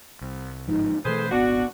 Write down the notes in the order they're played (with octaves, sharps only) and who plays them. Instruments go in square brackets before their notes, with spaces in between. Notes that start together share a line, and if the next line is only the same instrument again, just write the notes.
[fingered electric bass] C2
[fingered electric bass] G1 G#2 F3 [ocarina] D#4
[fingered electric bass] B2 E3 A3 [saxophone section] G#4 B4 C5 [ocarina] A4
[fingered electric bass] D#1 G#1 [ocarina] B3 [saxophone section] D4 F#4